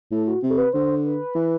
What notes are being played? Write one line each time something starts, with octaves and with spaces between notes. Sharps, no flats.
A2 A4
F#4
C3 G4
A4
B4
D3 C5
B4
E3